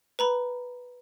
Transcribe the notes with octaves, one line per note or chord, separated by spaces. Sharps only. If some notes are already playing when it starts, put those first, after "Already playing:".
B4 A#5 B5